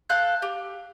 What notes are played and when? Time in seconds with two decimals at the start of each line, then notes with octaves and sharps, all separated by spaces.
0.09 A4 F5 F#6 G6
0.42 G4